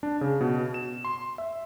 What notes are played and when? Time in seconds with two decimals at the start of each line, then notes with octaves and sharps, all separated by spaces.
0.03 D4
0.21 C#3
0.41 B2
0.74 E7
1.05 C6
1.38 E5